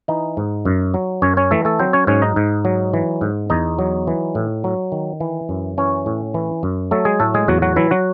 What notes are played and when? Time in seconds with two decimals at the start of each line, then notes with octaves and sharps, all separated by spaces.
0.08 E3 D#4 D#5
0.37 G#2
0.65 F#2
0.94 F#3
1.22 F#2 C#4 C#5
1.37 C#4 C#5
1.51 E3 A3 A4
1.65 A3 A4
1.79 F#3 C4 C5
1.93 C#4 C#5
2.07 G#2 C#4 C#5
2.22 D#4 D#5
2.36 G#2
2.65 F#3
2.94 E3
3.21 G#2
3.50 E2 D#4 D#5
3.79 F#3
4.07 E3
4.35 A2
4.64 F#3
4.92 D#3
5.20 E3
5.49 F#2
5.78 E3 C#4 C#5
6.06 A2
6.34 E3
6.63 F#2
6.91 F#3 A3 A4
7.05 G#3 G#4
7.20 A2 A3 A4
7.34 G#3 G#4
7.48 E2 F#3 F#4
7.62 F#3 F#4
7.76 E3 F#3 E4
7.91 F#3 F#4